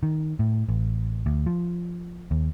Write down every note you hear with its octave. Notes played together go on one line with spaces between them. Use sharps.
D#3
A2
A1
D2
F3
D#2